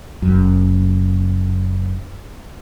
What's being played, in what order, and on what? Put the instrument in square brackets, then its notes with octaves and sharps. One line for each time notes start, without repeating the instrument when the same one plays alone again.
[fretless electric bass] F#1 F#2